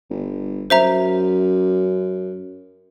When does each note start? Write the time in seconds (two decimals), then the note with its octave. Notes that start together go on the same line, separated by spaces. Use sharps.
0.10 G1
0.70 F#2 C5 E5 A#5